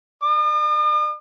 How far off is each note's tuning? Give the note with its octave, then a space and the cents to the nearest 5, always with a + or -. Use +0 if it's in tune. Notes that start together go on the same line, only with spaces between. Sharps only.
D5 +35 D#6 -45